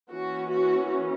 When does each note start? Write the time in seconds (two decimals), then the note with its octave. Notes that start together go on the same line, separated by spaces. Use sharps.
0.12 E3 A#3 C#4 F#4
0.51 F#4